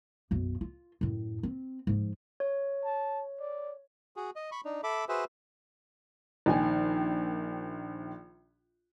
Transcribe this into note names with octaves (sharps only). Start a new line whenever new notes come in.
B1 F#2
F4
F#2 A2
C4
G#2 F3
C#5
A5
D5
F#4 G#4
D#5
B5 C#6
D4 D#4
A4 E5 B5 D6
F#4 G#4 B4 C5 E5
A#1 D#3 G#5